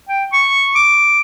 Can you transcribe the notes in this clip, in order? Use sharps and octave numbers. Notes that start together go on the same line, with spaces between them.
G5
C#6
D6